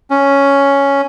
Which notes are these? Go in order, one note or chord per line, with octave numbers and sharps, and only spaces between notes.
C#4